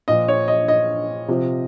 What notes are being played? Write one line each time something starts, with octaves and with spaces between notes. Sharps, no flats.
A#2 F3 D#5
C#5
D#5
D#5
C3 F3